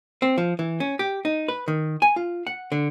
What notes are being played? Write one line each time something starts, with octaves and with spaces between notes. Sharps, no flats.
C4
F3
E3
C#4
G4
D#4
B4
D#3
G#5
F4
F#5
D3